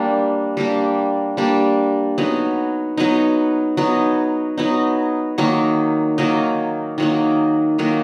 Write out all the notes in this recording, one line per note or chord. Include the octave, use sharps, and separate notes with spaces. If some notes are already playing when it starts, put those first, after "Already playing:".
Already playing: G3 A#3 D4 G4
G3 A#3 D4 G4
G3 A#3 D4 G4
F#3 B3 D#4
F#3 B3 D#4
F#3 B3 D#4
F#3 B3 D#4
D#3 F#3 A#3 D#4
D#3 F#3 A#3 D#4
D#3 F#3 A#3 D#4
D#3 F#3 A#3 D#4